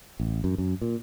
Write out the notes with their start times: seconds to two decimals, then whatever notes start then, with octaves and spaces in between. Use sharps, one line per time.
0.20 A1
0.44 F#2
0.58 F#2
0.82 A#2